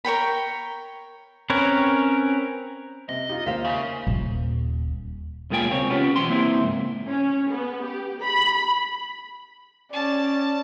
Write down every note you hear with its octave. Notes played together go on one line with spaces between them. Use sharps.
A#4 C#5 G5 B5
C4 C#4 A#4 B4 C#5
C3 D#5
D#4 F4 G4
D#2 A#4 C5 E5 F5
C#3
D#1
B1 G#3 A#3 F4 G5 G#5
C#2 C4 C#5
B3 C#4 F4 G4
B1 E2 G4 C5 C6
A#3 C4 E4
C#2 G#2
C#4
B3
G4
B5
C#4 D5 A5